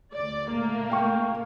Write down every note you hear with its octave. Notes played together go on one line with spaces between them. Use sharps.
D2 D5
C#2 A#2 A3 A#3
F5 G5 C#6